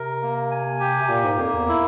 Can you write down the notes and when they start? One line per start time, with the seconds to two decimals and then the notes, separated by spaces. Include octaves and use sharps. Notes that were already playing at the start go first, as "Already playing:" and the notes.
Already playing: C3 A#4
0.23 A#3
0.51 G#5
0.80 G4
1.02 C3
1.09 A#2 A#3
1.24 G#2
1.38 F2 A#3
1.53 E2
1.68 E4